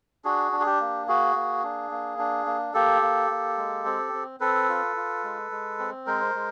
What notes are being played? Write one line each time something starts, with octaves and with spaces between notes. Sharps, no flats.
D4 F#4 G#4
D4
G#4
G4
A#3
F#4 G#4
A#3
D4
A#3
D4
A#3
A#3 G4 A4
A#3
A#3
G#3
C4
C4
C4 A4 B4
F4
F4
G#3
G#3
C4
G#3 A#4 C5
G#3